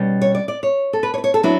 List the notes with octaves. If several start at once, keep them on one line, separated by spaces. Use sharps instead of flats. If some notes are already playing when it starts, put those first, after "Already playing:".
Already playing: B2 G3 C#4
C#5
D5
D5
C#5
A4
B4
C#5
B4
C#5
A4
F#3 B3 D4 E4